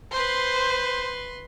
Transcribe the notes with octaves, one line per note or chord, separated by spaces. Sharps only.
B4 C5 C6